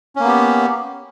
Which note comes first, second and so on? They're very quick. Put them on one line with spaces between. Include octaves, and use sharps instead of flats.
C#4 A#3 B3 G4